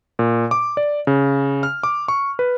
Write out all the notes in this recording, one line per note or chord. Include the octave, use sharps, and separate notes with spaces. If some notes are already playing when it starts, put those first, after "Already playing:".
A#2
D6
D5
C#3
F6
D6
C#6
B4